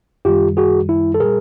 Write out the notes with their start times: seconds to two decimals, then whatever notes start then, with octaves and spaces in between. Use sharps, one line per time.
0.25 F#2 D#3 G3 F4 G4
0.57 F#4 G#4
0.89 E4
1.14 A4
1.20 A#2 G3 G#4 A#4